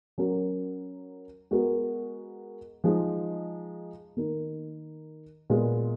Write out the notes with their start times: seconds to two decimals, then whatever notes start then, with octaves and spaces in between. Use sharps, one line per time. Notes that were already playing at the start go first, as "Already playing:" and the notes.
0.18 F#3 C#4 F#4 A#4
1.51 G#3 B3 F#4 A#4
2.84 F3 G#3 D#4
4.17 D#3 A#3 D#4 A#4
5.50 A#2 G#3 B3 F4